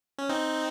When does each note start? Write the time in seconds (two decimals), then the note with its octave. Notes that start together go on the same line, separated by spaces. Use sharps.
0.18 C#4
0.29 C4 D#4